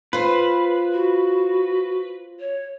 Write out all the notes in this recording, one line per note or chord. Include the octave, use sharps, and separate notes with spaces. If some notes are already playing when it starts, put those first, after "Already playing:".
F4 B4 C5
F#4
C#5